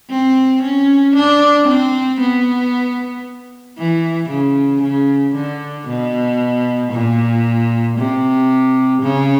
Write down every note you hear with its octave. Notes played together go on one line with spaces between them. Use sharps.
C4
C#4
D4
C4
B3
E3
C#3
C#3
D3
B2
A#2
C3
C#3